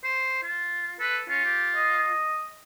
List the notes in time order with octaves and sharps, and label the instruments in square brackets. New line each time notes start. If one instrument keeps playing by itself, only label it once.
[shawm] C5
F4
[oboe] A4 [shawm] B4
[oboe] C#4 [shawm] F4
[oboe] G4
D#5